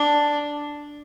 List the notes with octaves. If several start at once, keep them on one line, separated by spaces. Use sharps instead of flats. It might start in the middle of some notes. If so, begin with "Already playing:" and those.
Already playing: D4